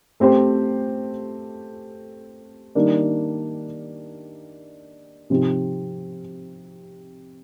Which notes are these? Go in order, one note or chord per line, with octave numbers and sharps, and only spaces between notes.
A3 C4 G4 C5
D#3 G3 A#3 D4
C3 F3 C4 D#4 G4